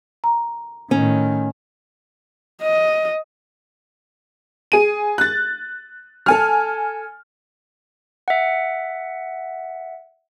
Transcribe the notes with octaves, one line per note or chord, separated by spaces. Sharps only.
A#5
A2 D#3 C#4
D#5
G#4 D#7
F#6 A6
A4 G#5 F6
E5 F#5